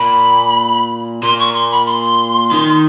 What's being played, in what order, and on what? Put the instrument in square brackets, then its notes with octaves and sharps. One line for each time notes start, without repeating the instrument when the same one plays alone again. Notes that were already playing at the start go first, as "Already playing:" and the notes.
Already playing: [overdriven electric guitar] A#2 [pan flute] B5
[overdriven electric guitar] A#2 [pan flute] C6
[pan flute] C#6
C6
B5
C6
[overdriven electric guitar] D#3